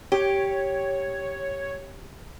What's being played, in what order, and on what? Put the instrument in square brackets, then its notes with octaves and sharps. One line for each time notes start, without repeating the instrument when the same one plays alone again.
[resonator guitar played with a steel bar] G4 [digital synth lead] C#5